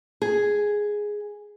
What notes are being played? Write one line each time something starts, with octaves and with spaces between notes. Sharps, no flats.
G#4